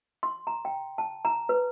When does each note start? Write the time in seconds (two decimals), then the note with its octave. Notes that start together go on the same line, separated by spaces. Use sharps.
0.23 C6
0.47 A#5
0.65 G5
0.98 A5
1.25 A#5
1.49 B4